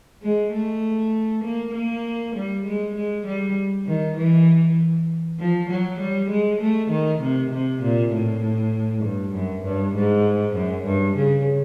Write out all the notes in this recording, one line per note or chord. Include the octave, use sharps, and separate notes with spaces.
G#3
A3
A#3
A#3
G3
G#3
G#3
G3
D#3
E3
F3
F#3
G3
G#3
A3
D#3
C3
C3
A#2
A2
G2
F#2
G2
G#2
F#2
G2
C#3